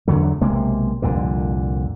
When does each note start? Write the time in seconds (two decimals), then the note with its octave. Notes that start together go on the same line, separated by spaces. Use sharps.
0.08 E2 D3 F#3 A3
0.41 B1 C3 G#3 A#3
1.02 C2 F2 A#2 D3